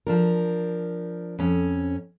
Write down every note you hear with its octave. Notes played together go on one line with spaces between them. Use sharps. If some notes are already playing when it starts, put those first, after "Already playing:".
F3 D4 A#4
F2 C#4